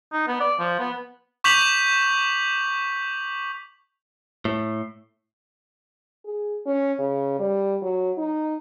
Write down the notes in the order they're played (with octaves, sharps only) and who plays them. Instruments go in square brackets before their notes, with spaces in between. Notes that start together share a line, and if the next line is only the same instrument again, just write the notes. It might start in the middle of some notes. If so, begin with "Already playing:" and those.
[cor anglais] D#4
B3
D5
F3
B3
[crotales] C#6 D6 G6 B6 F7 F#7
[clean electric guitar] A2
[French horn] G#4
C#4
C#3
G3
F#3
D#4